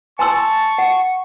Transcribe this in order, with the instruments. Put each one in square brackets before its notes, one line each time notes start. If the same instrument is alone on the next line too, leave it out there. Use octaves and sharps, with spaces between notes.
[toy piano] G#5 C6 E6 [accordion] A5 [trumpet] C#6
[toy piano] F#5